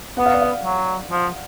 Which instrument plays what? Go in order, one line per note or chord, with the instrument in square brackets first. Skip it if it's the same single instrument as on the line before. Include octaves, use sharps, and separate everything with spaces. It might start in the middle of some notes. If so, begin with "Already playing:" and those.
[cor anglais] B3 [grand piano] F#5
[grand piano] F5
D5
F5
[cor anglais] F#3
F3